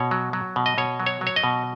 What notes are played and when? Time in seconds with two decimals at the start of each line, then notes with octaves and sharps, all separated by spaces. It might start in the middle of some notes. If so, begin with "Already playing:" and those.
Already playing: B2 C#5
0.11 F#3
0.33 F#3
0.56 B2
0.66 D#5
0.78 B2 C#5
1.00 F#3
1.06 C#5
1.21 F#3
1.27 C#5
1.36 D#5
1.44 B2